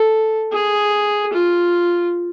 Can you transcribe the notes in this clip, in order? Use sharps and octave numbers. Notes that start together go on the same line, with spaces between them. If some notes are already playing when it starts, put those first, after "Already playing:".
Already playing: A4
G#4
F4